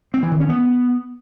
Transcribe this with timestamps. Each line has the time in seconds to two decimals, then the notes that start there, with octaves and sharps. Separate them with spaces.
0.14 C4
0.23 E3
0.32 D#3
0.40 C#4
0.49 B3